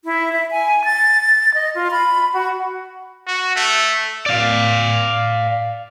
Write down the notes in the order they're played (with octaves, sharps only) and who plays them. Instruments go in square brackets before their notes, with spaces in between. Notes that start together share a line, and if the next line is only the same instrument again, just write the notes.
[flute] E4
E5
G#5
A6
D#5
F4
B5
F#4
[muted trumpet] F#4
A3
[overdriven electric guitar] D5 F5